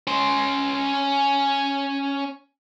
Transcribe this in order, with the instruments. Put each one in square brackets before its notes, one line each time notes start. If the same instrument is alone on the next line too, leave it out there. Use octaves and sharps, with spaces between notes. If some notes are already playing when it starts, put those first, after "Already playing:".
[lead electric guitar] C#4 C6